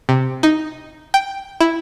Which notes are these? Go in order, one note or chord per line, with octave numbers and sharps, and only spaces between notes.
C3
D#4
G5
E4